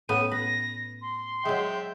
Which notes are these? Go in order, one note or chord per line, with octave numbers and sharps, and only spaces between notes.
A2 B3 C#4 D#7
B4 A#6
C6
F#3 G#3 E5 G5